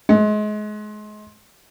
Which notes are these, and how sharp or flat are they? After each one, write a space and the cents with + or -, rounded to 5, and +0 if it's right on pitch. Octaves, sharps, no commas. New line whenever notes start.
G#3 +30